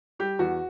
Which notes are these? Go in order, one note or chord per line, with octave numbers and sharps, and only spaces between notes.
G3 G4
E2 F#4